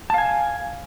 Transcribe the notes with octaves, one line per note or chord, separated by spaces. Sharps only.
F5 G#5 A5